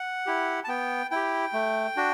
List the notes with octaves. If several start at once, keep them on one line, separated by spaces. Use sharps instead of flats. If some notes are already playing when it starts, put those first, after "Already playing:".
Already playing: F#5
E4 G4
A5
B3 G5
E4 G4 G5
A3
D4 F#4